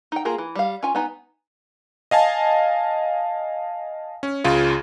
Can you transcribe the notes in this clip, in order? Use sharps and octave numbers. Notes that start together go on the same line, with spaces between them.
D#4 G5
A#3 F4 G#4 A#4
E3
G3 F5
C#4 F4 G#5
B3 D#4 G#5
D#5 F5 G#5 A5
C#4
C#2 C#3 F4